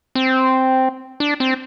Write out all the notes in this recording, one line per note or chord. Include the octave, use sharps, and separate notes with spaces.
C4
D4
C4